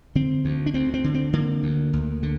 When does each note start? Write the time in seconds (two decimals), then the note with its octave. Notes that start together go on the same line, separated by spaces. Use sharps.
0.15 D3 C4
0.45 D2
0.66 D4
0.74 D2 C4
0.94 C4
1.04 D3
1.14 C4
1.33 D3 A#3
1.63 D2
1.93 D2
2.23 D3